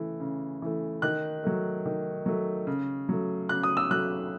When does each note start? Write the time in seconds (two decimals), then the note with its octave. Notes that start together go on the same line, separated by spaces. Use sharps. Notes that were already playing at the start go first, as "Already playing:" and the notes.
Already playing: C#3 E3 A3
0.20 C#3
0.62 E3 A3
1.02 D#3 F#6
1.44 F#3 A3
1.86 D#3
2.26 F#3 A3
2.67 C#3
3.09 F#3 A3
3.49 C#3 F#6
3.63 D#6
3.77 E6
3.91 F#3 A3 F#6